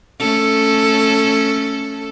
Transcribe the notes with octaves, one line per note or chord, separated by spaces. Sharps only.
A3 C#4 A4